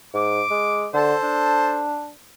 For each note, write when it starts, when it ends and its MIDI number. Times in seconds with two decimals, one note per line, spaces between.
0.14 0.43 44
0.14 0.87 86
0.51 0.87 56
0.94 1.14 50
0.94 1.82 69
0.94 1.82 72
1.23 2.11 62